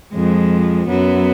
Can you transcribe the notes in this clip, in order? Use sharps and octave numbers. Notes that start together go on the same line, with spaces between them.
F2 F3 G#3
F#2 F#3 B3